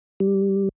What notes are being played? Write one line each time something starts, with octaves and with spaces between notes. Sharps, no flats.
G3